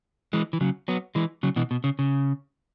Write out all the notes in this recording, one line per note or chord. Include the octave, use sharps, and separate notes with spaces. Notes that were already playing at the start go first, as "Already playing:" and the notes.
E3 G#3
E3
C#3 F#3
F#3 B3
E3 G#3
C#3 F#3
B2 E3
B2
C#3
C#3